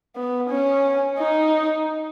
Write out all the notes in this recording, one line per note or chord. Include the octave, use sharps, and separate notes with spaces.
B3
C#4
D#4